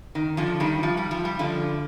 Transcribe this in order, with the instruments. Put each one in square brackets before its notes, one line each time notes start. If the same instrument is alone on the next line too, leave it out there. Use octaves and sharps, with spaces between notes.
[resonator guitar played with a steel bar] D#3
D3 F3
D#3 G3
F3
G3
F3
G3
D3 F3